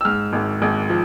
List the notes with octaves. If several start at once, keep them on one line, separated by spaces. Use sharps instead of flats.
E6
G#2 F6
G#1
G#1
F3